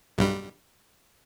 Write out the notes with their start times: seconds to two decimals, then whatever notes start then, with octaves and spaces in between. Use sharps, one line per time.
0.18 B1 G2 G3